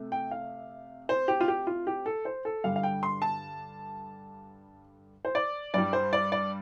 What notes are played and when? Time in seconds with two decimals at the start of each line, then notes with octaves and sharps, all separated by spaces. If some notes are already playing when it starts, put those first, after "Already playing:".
Already playing: C3 A3
0.12 G5
0.31 F5
1.09 C5
1.28 G4
1.40 F4
1.48 G4
1.67 F4
1.87 G4
2.06 A4
2.25 C5
2.45 A4
2.64 G2 D3 G3 F5
2.76 F5
2.83 G5
3.03 C6
3.22 A5
5.25 C5
5.35 D5
5.74 G2 G3 D5
5.93 C5
6.13 D5
6.32 D5